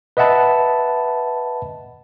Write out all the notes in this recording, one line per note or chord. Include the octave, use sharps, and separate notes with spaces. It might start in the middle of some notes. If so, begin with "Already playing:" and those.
B4 D#5 E5 F#5 A5 B5